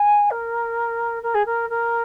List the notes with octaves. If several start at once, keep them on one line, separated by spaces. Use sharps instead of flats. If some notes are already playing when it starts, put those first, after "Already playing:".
Already playing: G#5
A#4
A#4
G#4
A#4
A#4